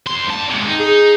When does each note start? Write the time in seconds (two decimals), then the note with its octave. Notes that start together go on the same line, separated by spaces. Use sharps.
0.06 F2 C6
0.29 G2 A5
0.50 C3 G#3
0.68 D#4
0.79 G#4